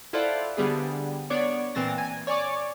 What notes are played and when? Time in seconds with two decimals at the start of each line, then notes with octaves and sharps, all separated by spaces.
0.13 E4 F4 A4 C5 D5 F#5
0.57 D3 G3 B3 G#4
1.30 B3 D4 C#5 D5
1.75 A#2 E3 C4 A6 A#6
1.98 G#5
2.27 C#5 D5 G#5 C#6 D6